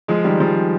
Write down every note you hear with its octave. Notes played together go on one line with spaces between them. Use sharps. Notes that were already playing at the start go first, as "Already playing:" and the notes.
F3 G#3
D#3 G3
F3 G#3